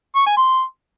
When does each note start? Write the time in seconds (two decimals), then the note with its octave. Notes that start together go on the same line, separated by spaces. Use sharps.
0.15 C#6
0.26 G#5
0.37 C6